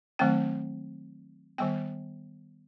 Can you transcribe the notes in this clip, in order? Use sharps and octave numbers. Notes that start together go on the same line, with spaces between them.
D#3 F#3 A3 C4 G5
D#3 G3 B3 G5